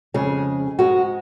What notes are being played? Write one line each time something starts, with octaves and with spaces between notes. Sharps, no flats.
F2 C#3 G#3 G#4
G#2 G#3 F#4